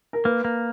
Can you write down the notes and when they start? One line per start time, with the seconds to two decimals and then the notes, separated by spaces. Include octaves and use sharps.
0.13 A#4
0.25 A#3 B4
0.45 A#3